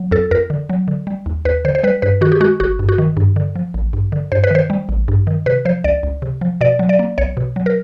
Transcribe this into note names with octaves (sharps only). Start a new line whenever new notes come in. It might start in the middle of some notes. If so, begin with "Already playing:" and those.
Already playing: F#3
F2 A4
F2 A#4
D3
F#3
D3
G3
D#2
D#2 B4
D3 C5
C5
G3 B4
G2 B4
D#3 F#4
G4
G#3 F#4
G1 F#4
G2
F#4
D#3
G2
D3
F3
A1
G2
D3
G2 C5
B4
D#3 C5
G3
A1
G2
D#3
C3 B4
F3 C5
C#2 D5
C#2
C3
F3
B2 D5
F#3
D5
A#3
B1 C#5
B2
F#3
A#4